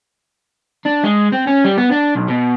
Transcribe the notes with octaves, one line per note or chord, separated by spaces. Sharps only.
D4
G#3
C4
C#4
G3
B3
D4
B1
B2